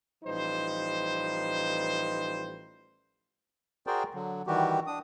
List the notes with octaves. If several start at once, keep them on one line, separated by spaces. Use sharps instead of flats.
A1 F3 G3 D#4 B4 C5
F#4 G#4 A#4 C5 D5 G5
D3 F#3
D#3 E3 G3 F#4 G4
D4 D#6